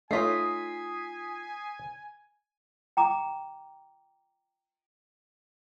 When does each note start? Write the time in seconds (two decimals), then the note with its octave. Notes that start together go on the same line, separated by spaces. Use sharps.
0.11 A3 D#4 F4 C#5 G#5 D#6 B6 C7
2.97 G5 A#5 D6